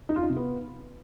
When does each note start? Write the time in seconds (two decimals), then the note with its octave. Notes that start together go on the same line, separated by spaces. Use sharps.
0.09 D#4
0.16 F4
0.23 D#4
0.30 C3
0.37 B3